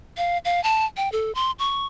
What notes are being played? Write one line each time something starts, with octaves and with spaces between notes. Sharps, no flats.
F5
F5
A5
G5
A4
C6
C#6